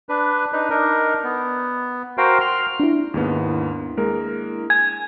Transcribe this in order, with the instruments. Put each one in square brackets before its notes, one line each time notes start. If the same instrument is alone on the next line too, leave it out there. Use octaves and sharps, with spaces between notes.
[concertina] D4 B4
D4 D#4 B4
D4 D#4 A#4
B3
F#4 A#4 C5 F5 G5
C6 F6
[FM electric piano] D4 E4
[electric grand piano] D#2 G#2 B3
G#3 A#3 A#4
[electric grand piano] G#5 [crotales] G#6